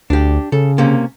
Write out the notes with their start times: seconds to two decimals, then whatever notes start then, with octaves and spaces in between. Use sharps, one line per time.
0.10 D2 D4 G4
0.52 C#3 A4
0.78 C3 A#3 C#4